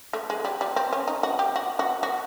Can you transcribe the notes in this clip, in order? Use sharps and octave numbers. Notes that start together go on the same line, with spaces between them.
A3
G#3
G3
G3
C4
C#4
D#4
F#4
G4
F#4
F#4
F#4